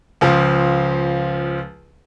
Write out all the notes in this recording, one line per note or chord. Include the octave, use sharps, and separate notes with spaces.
C#2 F3